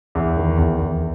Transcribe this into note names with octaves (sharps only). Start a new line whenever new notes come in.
E2
D#3
E2
E2